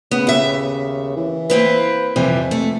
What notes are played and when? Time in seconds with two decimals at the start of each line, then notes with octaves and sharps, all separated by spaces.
0.11 C#3 B3
0.27 D#2 E5
1.17 E3
1.50 A#3 C4 B4
2.16 F2 C3 E3 G3
2.51 A3